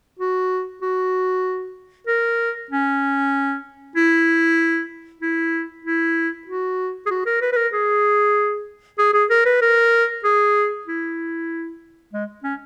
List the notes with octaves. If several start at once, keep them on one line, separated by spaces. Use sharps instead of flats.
F#4
F#4
A#4
C#4
E4
E4
E4
F#4
G#4
F#4
A#4
B4
B4
A#4
G#4
G#4
G#4
A#4
B4
A#4
G#4
E4
G#3
C#4